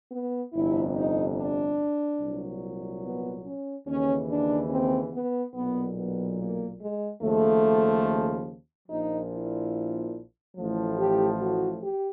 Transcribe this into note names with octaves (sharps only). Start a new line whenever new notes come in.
B3
G1 F2 C3 E4
D#4
D4
C2 A#2 F#3
B3
C#4
D#2 C#3 E3 C#4
D4
C4
B3
B1 A#2 F#3 B3
B3
A#3
G#3
D#2 C#3 F3 A3
A#1 A#2 F3 D#4
E4
A1 A2 F3
G4
F#4
G4